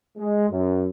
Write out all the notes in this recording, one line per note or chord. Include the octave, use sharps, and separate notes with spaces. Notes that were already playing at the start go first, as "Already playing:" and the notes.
G#3
F#2